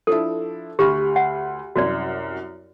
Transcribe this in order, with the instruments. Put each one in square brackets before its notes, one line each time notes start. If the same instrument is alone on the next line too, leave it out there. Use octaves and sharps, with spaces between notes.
[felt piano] F3 D4 E4 [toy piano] A4
[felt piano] D2 B5 F6 [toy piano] G4
[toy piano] F#5
[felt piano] C2 F#2 [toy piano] F#4 D5